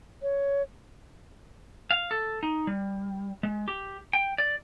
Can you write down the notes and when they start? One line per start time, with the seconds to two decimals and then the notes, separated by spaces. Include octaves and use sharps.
0.22 C#5
1.91 F5
2.11 A4
2.43 D#4
2.67 G3
3.43 G#3
3.68 G4
4.13 G5
4.38 D5